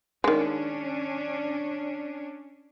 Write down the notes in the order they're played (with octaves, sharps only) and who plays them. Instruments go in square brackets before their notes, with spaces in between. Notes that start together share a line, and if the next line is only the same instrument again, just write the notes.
[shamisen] D#3 G#3 [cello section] C#4 D4